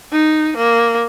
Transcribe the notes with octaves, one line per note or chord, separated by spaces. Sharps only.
D#4
A#3